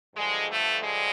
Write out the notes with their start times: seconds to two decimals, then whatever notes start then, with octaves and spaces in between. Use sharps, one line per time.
0.16 G2 D3 F3 G#3
0.48 A3
0.82 G#3